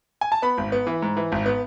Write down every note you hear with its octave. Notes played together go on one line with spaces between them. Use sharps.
G#5
A5
B3 B5
G#1
B3
E3
G#2
E3
G#1
B3